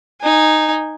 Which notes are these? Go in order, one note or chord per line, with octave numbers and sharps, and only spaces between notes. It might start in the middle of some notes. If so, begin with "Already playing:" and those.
D#4 G#5